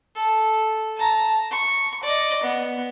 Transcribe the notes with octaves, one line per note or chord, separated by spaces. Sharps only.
A4
A5 A#5
C#6
D5 D#5
B3